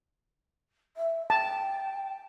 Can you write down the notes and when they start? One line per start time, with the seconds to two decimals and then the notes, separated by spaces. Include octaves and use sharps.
0.96 E5
1.30 G5 A5